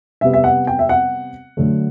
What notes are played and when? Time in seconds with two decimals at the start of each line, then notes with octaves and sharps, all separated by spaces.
0.21 C3 G3 B3 E5
0.34 E5
0.44 F#5
0.67 G5
0.79 E5
0.89 F#5
1.57 D3 F#3 A3